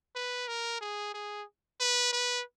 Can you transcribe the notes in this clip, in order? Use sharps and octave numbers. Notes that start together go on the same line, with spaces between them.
B4
A#4
G#4
G#4
B4
B4